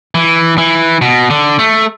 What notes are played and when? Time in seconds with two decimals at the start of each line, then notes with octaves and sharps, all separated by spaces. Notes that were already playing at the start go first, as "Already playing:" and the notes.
0.15 E3
0.58 E3
1.02 B2
1.30 D3
1.59 A3